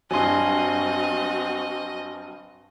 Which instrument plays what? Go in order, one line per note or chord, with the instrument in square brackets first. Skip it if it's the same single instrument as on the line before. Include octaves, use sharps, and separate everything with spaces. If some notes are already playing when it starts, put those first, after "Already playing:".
[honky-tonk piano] G2 F#3 [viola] C4 F#4 [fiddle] D#5 [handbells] G#5 C6